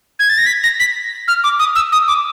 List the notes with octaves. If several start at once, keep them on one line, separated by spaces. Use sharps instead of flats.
G#6
A6
A#6
B6
A#6
B6
F6
D6
D#6
E6
D#6
D6